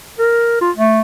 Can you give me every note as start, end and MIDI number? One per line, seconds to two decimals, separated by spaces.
0.19 0.57 70
0.61 0.71 65
0.76 1.02 57